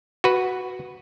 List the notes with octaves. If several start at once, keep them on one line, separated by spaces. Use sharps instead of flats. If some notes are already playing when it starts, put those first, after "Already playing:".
F#4 B4